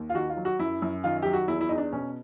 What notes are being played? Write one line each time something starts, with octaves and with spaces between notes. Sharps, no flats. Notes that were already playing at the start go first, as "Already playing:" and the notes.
Already playing: D#2
F4
D#3 F#4
F4
F#3
F#4
F#2 E4
F#2
D#3 F4
F#3 G4
F#4
E2 E4
E4
E2 D#4
D4
B2 C#4